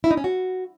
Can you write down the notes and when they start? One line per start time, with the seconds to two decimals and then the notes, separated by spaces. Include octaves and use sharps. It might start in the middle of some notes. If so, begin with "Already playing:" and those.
0.04 E4
0.11 D#4
0.17 C#4
0.24 F#4